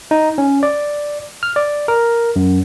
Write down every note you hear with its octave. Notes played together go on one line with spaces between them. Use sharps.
D#4
C#4
D5
F6
D5
A#4
F#2